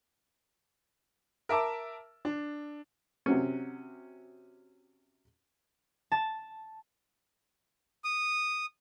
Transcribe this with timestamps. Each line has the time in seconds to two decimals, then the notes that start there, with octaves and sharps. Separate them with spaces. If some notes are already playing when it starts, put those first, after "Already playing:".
1.49 A#4 E5 A5 D6 E6
2.25 D4
3.26 C3 F#3 C#4
6.12 A5
8.04 D#6